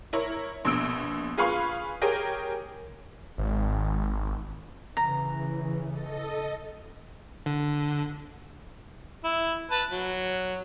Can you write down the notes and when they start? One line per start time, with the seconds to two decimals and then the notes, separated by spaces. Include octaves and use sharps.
0.13 E4 A#4 C#5
0.65 A#1 B2 E6 D7
1.37 F4 G#4 B4 F5 B5 C#6
2.02 G4 G#4 A#4 C#5
3.38 G#1
4.97 C#3 E3 A#5
5.87 A4 D#5
7.46 D3
9.24 E4
9.71 B4 A5
9.91 F#3